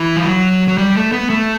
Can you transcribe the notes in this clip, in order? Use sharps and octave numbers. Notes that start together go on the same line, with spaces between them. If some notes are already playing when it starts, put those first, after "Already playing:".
Already playing: E3
F3
F#3
F#3
G3
A3
B3
A3